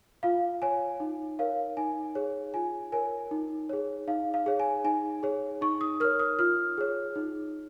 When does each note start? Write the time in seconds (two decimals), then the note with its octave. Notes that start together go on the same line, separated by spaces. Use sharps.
0.23 F4 F5
0.62 C#5 G#5
1.00 D#4
1.39 A#4 C#5 F5
1.77 D#4 G#5
2.15 G#4 C#5
2.54 F4 G#5
2.92 A#4 C#5 G#5
3.31 D#4
3.69 G#4 C#5
4.07 D#4 F5
4.34 F5
4.46 G#4 C#5
4.60 G#5
4.84 D#4 G#5
5.23 G#4 C#5
5.61 D#4 C#6
5.81 D#6
6.00 A#4 C#5 F6
6.19 D#6
6.39 F4 F6
6.78 G#4 C#5
7.16 D#4